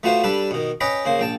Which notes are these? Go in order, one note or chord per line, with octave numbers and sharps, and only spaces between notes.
A3 B3 F4 F#4 B4 C5
G3 D4 A4 B4
B2 D#3
C#4 B4 D#5 G5 B5
C#3 A#3 C5
A#1 G5 A5